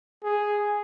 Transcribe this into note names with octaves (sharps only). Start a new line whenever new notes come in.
G#4